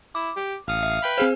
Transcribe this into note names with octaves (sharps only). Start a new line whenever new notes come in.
E4 D6
G4
A1 F5 D#6 C#7
E5
B4 G5 B5
C4 G#4 C5 F5